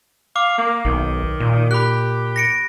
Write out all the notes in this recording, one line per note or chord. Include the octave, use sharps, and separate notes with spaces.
F5 D6
A#3
B1 D#3
A#2
G4 B5 F#6
A#6 C#7 D7